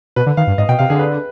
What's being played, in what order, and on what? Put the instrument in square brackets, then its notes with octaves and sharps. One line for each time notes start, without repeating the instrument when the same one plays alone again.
[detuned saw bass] B2 [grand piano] B4
[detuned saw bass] D3
[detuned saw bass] D#3 [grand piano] F5
[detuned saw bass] G2
[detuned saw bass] G#2 [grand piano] D#5
[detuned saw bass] B2 [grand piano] G5
[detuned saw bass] C3 [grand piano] F5
[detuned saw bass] D3 [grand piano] G#4
[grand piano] B4